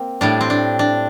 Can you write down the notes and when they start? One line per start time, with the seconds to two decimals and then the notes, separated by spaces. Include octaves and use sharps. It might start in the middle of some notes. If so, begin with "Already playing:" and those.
Already playing: A#3 C4
0.21 A2 G3 D4
0.41 C4
0.50 D4
0.79 D4